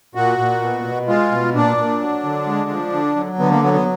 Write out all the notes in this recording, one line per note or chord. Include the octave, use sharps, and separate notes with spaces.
A#2 F#4
A#2
B2
B2
G#3 F4
B2
A#2 D4
A#2
F#3
D3
G#3
F3
D3
F#3
D3 B3
A#3
F#3 B3
B3